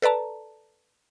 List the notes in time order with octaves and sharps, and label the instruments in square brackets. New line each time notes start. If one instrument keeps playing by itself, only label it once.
[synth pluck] A4 B4 D5 A5 A#5